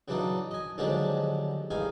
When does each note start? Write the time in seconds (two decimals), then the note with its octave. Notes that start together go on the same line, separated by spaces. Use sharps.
0.08 C#3 E3 F#3 D4 D#4
0.51 D#5 G#5
0.78 D#2 D3 F3 F#3 G#3 D4
1.70 A1 E2 D#4 F5 G#5